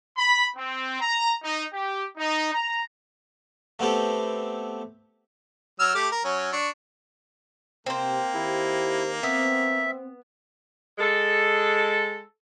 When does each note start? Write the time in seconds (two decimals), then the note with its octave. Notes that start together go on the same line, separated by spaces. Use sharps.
0.16 B5
0.57 C4
1.00 A#5
1.43 D#4
1.72 G4
2.17 D#4
2.52 A#5
3.79 A3 B3 C4 G4 A4
5.80 F#3 E6 F6
5.95 A3 G4 D6
6.12 A#4
6.25 F#3 C#4
6.53 D4 C#6
7.86 C3 A#3 C4 C5
8.34 D#3 E4 G4
9.23 B3 C4 E5
10.98 G#3 A4